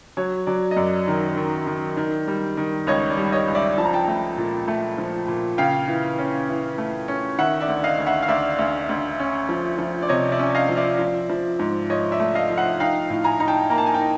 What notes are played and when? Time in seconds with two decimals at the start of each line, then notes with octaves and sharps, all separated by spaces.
0.17 F#3 C#5
0.46 F#3 D5
0.71 D#5
0.76 F#2 D5
1.07 D#3
1.37 D#3
1.67 D#3
1.97 D#3
2.28 G3
2.57 D#3
2.87 C#2 C#5 D#5
3.10 D5
3.17 G3
3.32 C#5 D#5
3.48 C#2
3.55 D5 E5
3.78 F3 A5
3.85 A#5
3.93 G5 A5
4.08 A3
4.38 A#2
4.68 A3
4.98 F3
5.28 A#2
5.58 C#3 F5 G5
5.88 E3
6.19 C#4
6.49 E3
6.78 A3
7.08 C#4
7.38 D#3 E5 F#5
7.61 D5 E5
7.69 D2
7.84 D#5 F5
7.99 D2
8.06 E5 F#5
8.22 F5
8.29 D2 D5 E5
8.59 D2
8.89 D2
9.20 C#4
9.49 F3
9.79 F3
10.02 D5
10.09 C3 C#5 D#5
10.32 D5 E5
10.39 C#4
10.55 D#5 F5
10.69 F3
10.77 D5 E5
10.99 F3
11.30 F3
11.59 G#2
11.90 F3 C#5 D#5
12.12 D5 E5
12.20 A3
12.35 D#5 F5
12.50 F3
12.57 E5 F#5
12.80 D#4 F5 G5
13.10 A2
13.24 G#5 A#5
13.40 D#4 A#5
13.48 G5 A5
13.70 A#3 A#5
13.78 A5
13.86 G#5
13.94 G5 A5
14.00 D#4